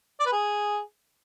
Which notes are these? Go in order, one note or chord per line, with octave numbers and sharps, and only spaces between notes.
D5
B4
G#4